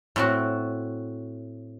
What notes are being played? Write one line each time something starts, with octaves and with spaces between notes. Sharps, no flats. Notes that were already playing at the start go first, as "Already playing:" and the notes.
A2 C4 F#4